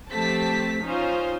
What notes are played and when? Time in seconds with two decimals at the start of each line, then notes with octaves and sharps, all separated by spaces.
0.11 F3 A3 C4 G4 A5 B6
0.82 C#4 D#4 F4 C5